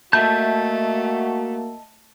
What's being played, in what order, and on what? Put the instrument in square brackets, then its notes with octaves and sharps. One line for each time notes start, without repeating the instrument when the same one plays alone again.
[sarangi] A3 [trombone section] A#3 F#4 [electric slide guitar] D#5 E5 A5 [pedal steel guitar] G6